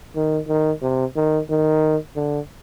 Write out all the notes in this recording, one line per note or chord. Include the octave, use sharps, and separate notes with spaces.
D#3
D#3
C3
D#3
D#3
D3